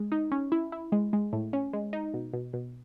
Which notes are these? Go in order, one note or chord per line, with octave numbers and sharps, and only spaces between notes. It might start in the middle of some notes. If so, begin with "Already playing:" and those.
Already playing: G#3
D#4
C#4
E4
E4
G#3
G#3
A2
C#4
G#3
D#4
B2
B2
B2